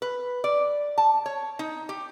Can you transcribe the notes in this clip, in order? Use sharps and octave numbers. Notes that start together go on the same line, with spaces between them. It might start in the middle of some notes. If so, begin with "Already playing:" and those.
B4
D5
A5
C#5
D#4
G4